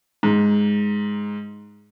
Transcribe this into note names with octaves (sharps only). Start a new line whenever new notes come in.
G#2